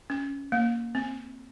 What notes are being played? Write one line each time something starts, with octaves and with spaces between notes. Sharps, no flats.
C#4
A#3
C4